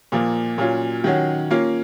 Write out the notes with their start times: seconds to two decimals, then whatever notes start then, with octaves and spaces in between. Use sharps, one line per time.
0.12 A#2 F3 A#3
0.58 A#2 F#3 C#4 F4
1.04 D#3 F#3 C#4 F#4
1.51 A#3 C#4 F4